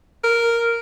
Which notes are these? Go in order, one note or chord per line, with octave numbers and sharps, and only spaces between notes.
A#4